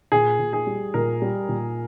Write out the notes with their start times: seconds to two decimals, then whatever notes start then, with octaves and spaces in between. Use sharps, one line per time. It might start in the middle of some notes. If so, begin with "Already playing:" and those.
0.12 A#2 G#4
0.39 A#2
0.53 G#4
0.67 G3
0.94 A#2 A#4
1.22 G3
1.49 A#2